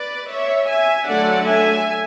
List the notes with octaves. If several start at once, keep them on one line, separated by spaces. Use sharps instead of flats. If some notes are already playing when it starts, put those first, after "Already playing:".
Already playing: B4 D5
C#5 E5
E5 G#5
D3 F#3 A3 D5 F#5
E5 G#5